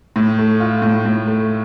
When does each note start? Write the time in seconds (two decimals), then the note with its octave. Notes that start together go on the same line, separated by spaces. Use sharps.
0.16 A2
0.38 A3
0.60 F4
0.82 A2
1.05 A2
1.27 A3